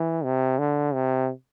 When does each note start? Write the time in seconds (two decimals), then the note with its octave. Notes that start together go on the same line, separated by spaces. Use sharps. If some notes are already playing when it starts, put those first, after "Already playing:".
Already playing: E3
0.24 C3
0.59 D3
0.94 C3